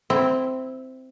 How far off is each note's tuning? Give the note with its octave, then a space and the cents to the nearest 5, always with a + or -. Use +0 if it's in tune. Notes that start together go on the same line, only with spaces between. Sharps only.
C4 -10 E4 +0